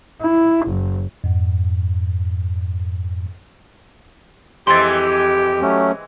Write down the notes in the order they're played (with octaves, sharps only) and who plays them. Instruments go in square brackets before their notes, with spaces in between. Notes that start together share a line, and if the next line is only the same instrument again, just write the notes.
[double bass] E4
F#1
[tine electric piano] F2 G#2
[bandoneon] F2 [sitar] E3 G#3 C4 [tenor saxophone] G4 [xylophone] C6 A6
[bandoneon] F#3 A3 C#4